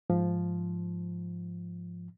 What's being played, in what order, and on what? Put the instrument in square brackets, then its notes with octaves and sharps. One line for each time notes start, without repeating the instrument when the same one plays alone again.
[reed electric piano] G#2 F3